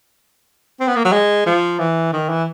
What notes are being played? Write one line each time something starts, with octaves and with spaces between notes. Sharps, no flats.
C4
B3
A#3
F#3
G#3
F3
E3
D#3
E3